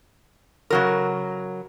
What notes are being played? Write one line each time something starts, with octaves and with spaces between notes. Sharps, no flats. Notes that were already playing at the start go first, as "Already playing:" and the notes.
C#3 F#3 A#4